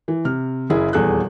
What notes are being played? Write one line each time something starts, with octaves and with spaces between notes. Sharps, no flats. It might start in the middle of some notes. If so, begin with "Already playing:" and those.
E3
C3 F6
F#1 E4 G#4
D#1 E2 G#4 A4 F#6